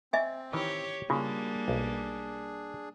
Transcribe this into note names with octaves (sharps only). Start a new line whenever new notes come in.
C4 D#5 E5 G#5
D#3 E3 G4 C#5
C#3 G3 A#3 D4 F4 F#4 G#4
B1